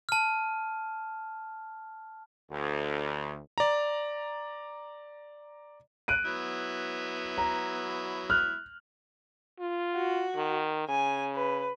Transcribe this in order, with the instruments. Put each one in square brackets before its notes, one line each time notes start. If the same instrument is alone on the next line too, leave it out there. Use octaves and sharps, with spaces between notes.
[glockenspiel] A5 F6
[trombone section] D2
[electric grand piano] D5 A#5
[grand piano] F#6 D7 D#7
[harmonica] F#3 B3 E4
[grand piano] A#5
F6 F#6
[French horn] F4
[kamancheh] F#4
[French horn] D#3
[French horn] C#3 [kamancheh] G#5
[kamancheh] B4